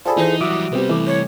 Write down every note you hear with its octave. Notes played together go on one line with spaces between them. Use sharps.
F4 G#4 A4 C5 D5 A5 B5
E3 D#4 C5
F#3 G3 F#4 E5 D6 D#6
C3 G3 B3 C4 G4
E3 A3 D6
C#5